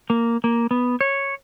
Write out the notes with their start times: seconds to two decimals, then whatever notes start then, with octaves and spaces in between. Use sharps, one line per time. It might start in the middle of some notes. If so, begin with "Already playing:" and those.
0.10 A#3
0.44 A#3
0.71 B3
1.01 C#5